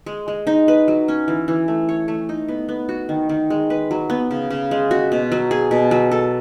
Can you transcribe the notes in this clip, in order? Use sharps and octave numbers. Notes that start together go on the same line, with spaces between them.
G#3
G#3
D#4
B4
F#3
C#4
E3
E3
A3
C#5
A3
D#4
B3
B3
F#4
D#3
D#3
G#3
B4
F#3
B3
C#3
C#3
G#3
F#4
B2
F#3
G#4
B2
F#3
A4